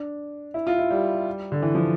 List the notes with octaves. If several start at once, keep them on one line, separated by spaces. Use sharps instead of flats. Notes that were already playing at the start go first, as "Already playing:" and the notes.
Already playing: D4
E4
F4
E4
G3
D3
E3
F3